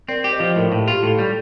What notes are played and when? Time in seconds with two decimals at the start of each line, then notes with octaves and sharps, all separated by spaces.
0.08 C4 A#4 D5
0.24 G4
0.32 C5 D#5
0.40 F3
0.46 D#5
0.55 A2 A#4 D5
0.72 A2
0.80 G4
0.88 F4
0.93 G4
1.03 A2 A4
1.19 G3